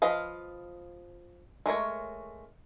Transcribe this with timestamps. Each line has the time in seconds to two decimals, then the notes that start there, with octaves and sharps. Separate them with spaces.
0.02 F3 B4 D#5 F5
1.66 G#3 A3 A#4 C#5